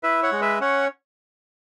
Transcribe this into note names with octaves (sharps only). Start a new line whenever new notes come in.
E4 B4 E5
C#5 F#5
G#3
B4 E5
C#4 C#5 F#5